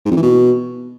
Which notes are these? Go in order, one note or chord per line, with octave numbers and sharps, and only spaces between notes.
G#2
F2
E3
B2